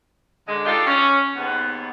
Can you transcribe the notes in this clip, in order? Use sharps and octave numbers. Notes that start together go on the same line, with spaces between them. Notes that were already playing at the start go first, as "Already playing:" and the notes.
D3 G#3
D4 D#4 F4 G4 A4
C#4
D#2 G#2 B3